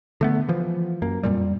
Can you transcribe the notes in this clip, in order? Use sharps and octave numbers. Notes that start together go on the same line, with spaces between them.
D3 A3 B3
E3 F3
F#2 A#3
F2 A#2 G3